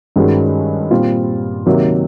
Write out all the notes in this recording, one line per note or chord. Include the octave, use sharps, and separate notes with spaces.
G2 D#3 G#3 C#4 F#4
A#2 G3 C4 F4
C3 D#3 F#3 A#3